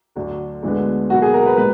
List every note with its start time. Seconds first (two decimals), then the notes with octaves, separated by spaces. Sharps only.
0.16 D2 D3 F#3
0.63 D2 D3 G#3 B3
1.10 B1 B2 A#3 F#4
1.22 G#4
1.34 A#4
1.46 B4
1.57 A#2 G#3 B4